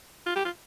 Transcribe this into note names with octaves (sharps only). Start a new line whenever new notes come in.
F4
G4
F4